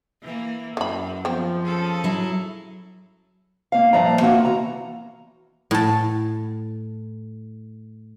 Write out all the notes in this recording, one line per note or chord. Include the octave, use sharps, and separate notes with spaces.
E3 A#3
F#2 E3 B5
F3 B3 C4
C#4 G#4 A4
F#3 E4
G#2 A#3 F5
G2 A#2 F3 D5 E5 A#5
A#3 F4 F#4
E3 A#5
A2 A5